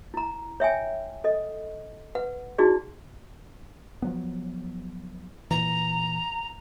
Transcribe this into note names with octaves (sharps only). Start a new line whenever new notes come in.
E4 A#5
C#5 E5 G5 G#5
A4 D#5
B4 F#5
D#4 E4 F#4 G#4 D5
F3 F#3 B3
A#2 E3 A#5